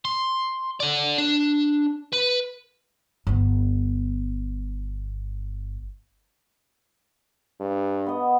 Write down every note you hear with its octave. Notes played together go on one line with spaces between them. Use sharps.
C6
A4 D5
D4
B4
G1 B3
G2
B3 D#5